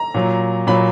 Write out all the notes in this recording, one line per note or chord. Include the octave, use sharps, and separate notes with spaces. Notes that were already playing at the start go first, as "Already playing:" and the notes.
Already playing: A#5
A#2 F#3
A#2 F#3 B5